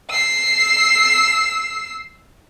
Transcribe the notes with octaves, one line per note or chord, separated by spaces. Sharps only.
E6 C7